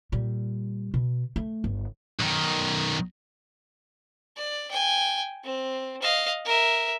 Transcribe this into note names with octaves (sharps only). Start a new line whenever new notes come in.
A#2 G3
B2
A3
G1
B1 D#3
D5
G5 G#5
C4
D#5 F5
A#4 E5